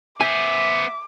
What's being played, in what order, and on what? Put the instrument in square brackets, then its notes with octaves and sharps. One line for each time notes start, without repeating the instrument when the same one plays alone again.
[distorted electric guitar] B3 C5 [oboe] E5 [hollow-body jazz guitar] G#5 [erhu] D6